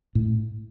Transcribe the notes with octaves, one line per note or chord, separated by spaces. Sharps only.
A2